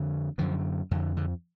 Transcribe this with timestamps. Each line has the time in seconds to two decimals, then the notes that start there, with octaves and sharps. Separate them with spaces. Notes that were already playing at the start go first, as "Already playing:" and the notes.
Already playing: F2 D3
0.38 F#2 D3 F3
0.91 F2 D#3
0.94 D3
1.17 D3